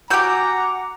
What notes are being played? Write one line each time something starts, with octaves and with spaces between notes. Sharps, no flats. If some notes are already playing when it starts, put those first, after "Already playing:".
F#4 G4 F#5 G#5 A#5 D6 E6 G6